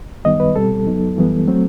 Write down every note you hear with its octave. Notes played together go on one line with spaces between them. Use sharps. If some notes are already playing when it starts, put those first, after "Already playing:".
F#2 D#3 G3 B3 D#5
B4
B2 G3 C4 A4
F#2 F#3 B3 D#4
F#2 E3 G3 B3
F#3 A3 C4